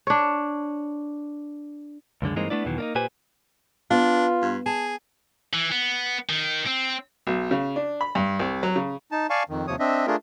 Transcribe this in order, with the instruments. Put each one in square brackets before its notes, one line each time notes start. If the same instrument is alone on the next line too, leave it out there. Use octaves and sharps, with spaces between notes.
[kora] D4 C#5
[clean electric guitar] C#2 F#2 D3 G#3
G2 E3 G#3 A#3 C4 D#4
A3 B3 D4 E4 D5
E2 B2 D#3 E3 F#3
A#3 D4 D#4
A#2 G4 B4 C5 G#5
[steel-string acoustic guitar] B3 [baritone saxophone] D4 [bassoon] F4
[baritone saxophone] G2
[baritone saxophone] G#4 [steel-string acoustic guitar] A5
[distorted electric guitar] E3
B3
D#3
C4
[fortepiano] B1
C#3
D4
B5
G2
C2
F#3
C#3
[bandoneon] D#4 A5
D5 F5 G#5 A5 C#6
F2 D#3
D#2 C3 F3 C#5 D#6
C4 D4 D#5 E5
A3 D4 F4 G#4 A#4